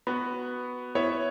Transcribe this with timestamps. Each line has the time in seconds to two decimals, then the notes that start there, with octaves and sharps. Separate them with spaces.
0.07 B3 F#4 B4
0.95 B3 E4 C#5 E5